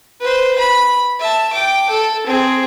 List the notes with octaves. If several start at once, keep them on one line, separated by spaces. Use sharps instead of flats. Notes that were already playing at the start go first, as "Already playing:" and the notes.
B4 C5
B5
E5 A5
G5 D6
A4
C4 G#4